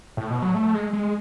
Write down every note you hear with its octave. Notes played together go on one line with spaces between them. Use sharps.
A2
B2
F#3
A3
G#3
G#3